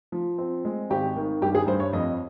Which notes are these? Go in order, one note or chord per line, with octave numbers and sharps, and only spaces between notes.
F3
C4
G#3
G#1 G4
D#3
G2 G4
G#4
G2 C5
C#5
F2 D#5